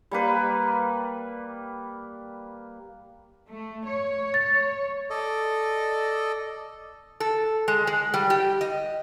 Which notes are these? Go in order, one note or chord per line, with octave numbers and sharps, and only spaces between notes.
G3 A#3 B4
A3
C#5
A6
A4 D5 D#5
A4
G#3
G#3
G3
G4
D#5